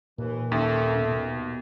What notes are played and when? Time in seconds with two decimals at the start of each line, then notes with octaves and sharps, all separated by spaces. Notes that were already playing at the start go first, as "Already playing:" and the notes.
0.19 D#2 A#2 E3
0.52 D#2 C#4 A4 E5
0.98 B2